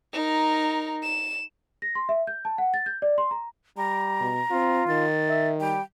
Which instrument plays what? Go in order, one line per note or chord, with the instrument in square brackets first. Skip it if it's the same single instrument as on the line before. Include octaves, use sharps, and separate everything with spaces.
[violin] D#4 A#4
E7
[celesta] A#6
C6
E5
G6
A5
F#5
A6
G6
D5
C6
A#5
[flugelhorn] G3 [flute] A#5
[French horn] B2
[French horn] C4 [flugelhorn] F4
[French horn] D#3 [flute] A6
[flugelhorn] E5
[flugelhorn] G3 [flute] G5